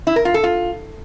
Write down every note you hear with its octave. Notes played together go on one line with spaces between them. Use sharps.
E4
A#4
F4
A4
F4